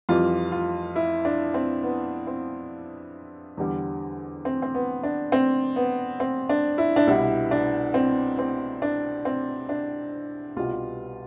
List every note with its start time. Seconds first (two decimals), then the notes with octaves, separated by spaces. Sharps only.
0.09 F2 E3 G3 F4
0.52 F4
0.96 E4
1.25 D4
1.54 C4
1.83 B3
2.27 C4
3.57 E2 D3 G3
4.45 C4
4.62 C4
4.75 B3
5.03 D4
5.32 C4
5.76 B3
6.20 C4
6.49 D4
6.78 E4
6.96 D4
7.07 C2 B2 G3 E4
7.51 D4
7.94 C4
8.39 C4
8.82 D4
9.25 C4
9.69 D4
10.56 C2 B2 G3 F4